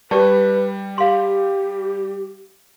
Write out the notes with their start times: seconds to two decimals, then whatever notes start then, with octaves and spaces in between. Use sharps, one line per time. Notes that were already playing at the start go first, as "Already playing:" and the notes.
0.11 G3 G4 B4 D5 A5
0.98 G4 F5 C6